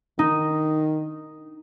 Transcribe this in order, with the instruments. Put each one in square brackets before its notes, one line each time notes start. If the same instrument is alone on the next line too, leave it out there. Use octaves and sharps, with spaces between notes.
[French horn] D#3 [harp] D#4